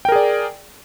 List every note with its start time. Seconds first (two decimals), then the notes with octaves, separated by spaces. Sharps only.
0.05 G5
0.09 A#4
0.12 G#4
0.16 D5